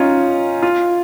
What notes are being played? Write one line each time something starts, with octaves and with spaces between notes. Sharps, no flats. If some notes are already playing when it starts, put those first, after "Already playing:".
Already playing: C#4 D#4 F4
F4